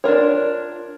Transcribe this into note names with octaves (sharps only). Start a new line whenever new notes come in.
D4 F4 A#4 C#5